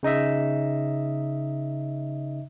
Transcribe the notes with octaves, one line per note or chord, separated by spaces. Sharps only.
C#3 D#4 D#5 E5